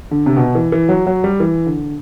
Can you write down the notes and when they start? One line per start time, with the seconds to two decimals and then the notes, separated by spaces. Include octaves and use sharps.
0.11 D3
0.26 C3
0.37 B2
0.55 E3
0.72 E3
0.89 F#3
1.07 F#3
1.24 G3
1.40 E3
1.66 D3